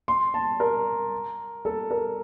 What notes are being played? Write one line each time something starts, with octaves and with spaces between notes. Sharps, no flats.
C6
A5
A#4
A4
A#4